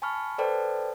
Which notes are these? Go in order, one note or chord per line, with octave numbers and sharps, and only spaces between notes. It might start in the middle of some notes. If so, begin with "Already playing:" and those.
G#5 A5 B5 C#6 F6
A4 B4 C5 D5 G5 A5